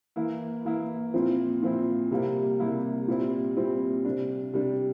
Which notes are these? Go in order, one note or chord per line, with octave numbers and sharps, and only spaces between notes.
E3 A#3 E4
E3 A#3 E4
A#2 F3 C4 E4
A#2 F3 C4 E4
C3 G3 A#3 E4
C3 G3 A#3 E4
A#2 G3 C4 E4
A#2 G3 C4 E4
C3 G3 D4
C3 G3 D4